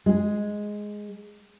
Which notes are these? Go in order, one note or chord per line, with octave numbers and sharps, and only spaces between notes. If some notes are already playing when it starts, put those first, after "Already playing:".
G#3 G#4